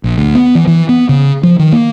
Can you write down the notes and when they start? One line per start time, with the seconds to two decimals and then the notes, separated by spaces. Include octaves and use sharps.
0.04 A#1
0.18 D2
0.35 B3
0.55 E3
0.67 E3
0.89 B3
1.09 C#3
1.43 F3
1.59 D#3
1.72 A#3